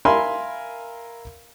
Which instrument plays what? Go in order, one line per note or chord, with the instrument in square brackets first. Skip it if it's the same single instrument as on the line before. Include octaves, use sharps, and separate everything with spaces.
[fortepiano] A#4 E5 F5 G#5 B5 C6